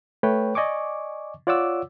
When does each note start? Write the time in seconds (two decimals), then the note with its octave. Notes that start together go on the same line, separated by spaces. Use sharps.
0.23 A3 B4 C#5 G5
0.55 D5 D#5 G#5 C#6 D6
1.47 F4 C#5 D5 F#5 D6 E6